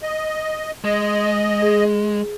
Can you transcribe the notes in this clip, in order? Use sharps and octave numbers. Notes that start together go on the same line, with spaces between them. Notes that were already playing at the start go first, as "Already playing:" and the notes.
D#5
G#3 D#5
G#4